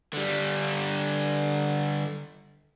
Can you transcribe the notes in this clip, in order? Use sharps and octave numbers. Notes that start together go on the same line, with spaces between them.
D3 G3